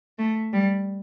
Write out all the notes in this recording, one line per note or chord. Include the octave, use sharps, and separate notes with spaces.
A3
G3